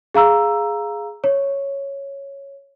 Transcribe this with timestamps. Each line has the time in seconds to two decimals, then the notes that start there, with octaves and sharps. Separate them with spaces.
0.14 G#4 F5 A#5 E6
1.24 C#5